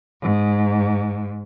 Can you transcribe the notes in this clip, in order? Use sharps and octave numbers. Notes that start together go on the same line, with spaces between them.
G#2